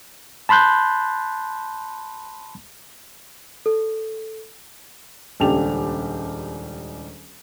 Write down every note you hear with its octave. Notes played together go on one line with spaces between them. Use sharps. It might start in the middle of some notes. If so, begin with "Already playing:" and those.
A5 B5 C6 F#6 G6
A4
D#1 C#2 D4 G4 A5 F7